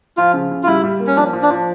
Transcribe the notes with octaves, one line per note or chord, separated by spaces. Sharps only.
F3 F4
C#3
C#3
F4
G3 E4
G3
A#3
C#4
F3 D4
F3
D4
F3